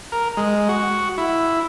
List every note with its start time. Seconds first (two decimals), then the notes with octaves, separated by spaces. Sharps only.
0.12 A#4
0.37 G#3
0.69 F#4
1.18 E4